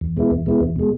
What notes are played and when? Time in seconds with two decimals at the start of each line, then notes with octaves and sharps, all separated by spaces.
0.01 E2
0.17 B2 G#3 B3 E4
0.31 E2
0.46 B2 G#3 B3 E4
0.61 E2
0.76 B2 G#3